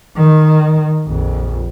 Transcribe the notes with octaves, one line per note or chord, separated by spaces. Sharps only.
D#3
A#1 F2